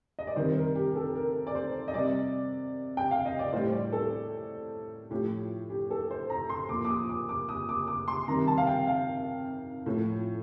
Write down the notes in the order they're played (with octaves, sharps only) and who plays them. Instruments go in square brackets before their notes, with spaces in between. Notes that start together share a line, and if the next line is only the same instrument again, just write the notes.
[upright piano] D#5
D5
C3 D#3 G3 C5
A#4
G4
A4
A#4
D5
C5
D#5
C3 G3 D5
G5
F5
D#5
D5
A2 C5
G3
D5
A4
A2 F3 G4
G4
A4
C5
A#5
C6
A#2 F3 D6
D6
D#6
D6
D6
D#6
D6
D6
C6
C3 D#3 G3 A#5
A5
F5
G5
F5
A2 F3